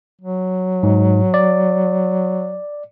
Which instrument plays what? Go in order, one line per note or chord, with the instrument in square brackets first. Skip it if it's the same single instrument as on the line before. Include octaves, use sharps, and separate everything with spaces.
[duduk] F#3
[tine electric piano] G#2
D5